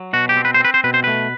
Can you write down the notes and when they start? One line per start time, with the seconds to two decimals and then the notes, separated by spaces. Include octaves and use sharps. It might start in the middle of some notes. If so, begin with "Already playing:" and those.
Already playing: F#3
0.13 B2 F#4
0.29 G4
0.37 C4
0.45 B4
0.54 C5
0.60 C4 B4
0.74 C5
0.84 B2 B4
0.94 C5
1.04 A3 B4